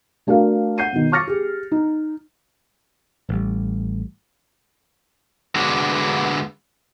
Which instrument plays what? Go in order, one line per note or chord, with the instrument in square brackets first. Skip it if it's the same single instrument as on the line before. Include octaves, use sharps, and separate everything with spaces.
[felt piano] A3 D4 F#4 A#4 F5
F#5 G6 C7 D#7
B2 D#3
C#6 D6 F6 A6 A#6 C#7
G4 G#4
D#4
[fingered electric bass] A1 G3
[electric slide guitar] D3 G#3 B3 D4 F#4